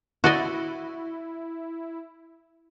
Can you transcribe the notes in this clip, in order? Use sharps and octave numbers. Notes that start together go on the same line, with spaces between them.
E4 F#4 D5 D#5